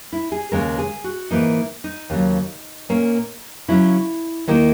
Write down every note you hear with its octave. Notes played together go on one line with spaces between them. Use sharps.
E4
G#4
D#2 C#3 G#3 A#4
G#4
F#4
G#2 E3 A#3 D#4
D#4
D#2 C#3 F#3
A#2 A#3 C#4
C#3 F#3 C#4 E4
D#2 D#3 A#3 D#4 E4